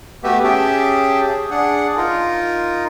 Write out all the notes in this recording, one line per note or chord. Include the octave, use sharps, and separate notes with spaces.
A3 B3 F#4 G4 B4 E5
C#4 G4 G#4 E5 G5 A5
G#4
D4 G#4 F#5
D#4 F4 A#4